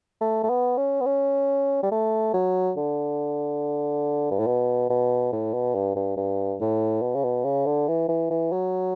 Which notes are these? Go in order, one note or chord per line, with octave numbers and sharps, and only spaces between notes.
A3
A3
B3
C#4
B3
C#4
G3
A3
F#3
D3
G2
A2
B2
B2
A2
B2
G2
G2
G2
A2
B2
C#3
B2
C#3
D3
E3
E3
E3
F#3